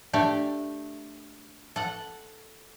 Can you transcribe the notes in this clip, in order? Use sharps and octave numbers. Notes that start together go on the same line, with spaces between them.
A3 D4 G4
A4 F#5